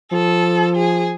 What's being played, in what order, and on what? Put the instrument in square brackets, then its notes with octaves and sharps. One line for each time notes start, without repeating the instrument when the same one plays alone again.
[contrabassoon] F3 [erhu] A4
[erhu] G#4